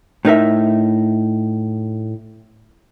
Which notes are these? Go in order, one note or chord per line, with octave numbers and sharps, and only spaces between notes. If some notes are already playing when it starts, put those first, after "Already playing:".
A2 D#4 A#4 E5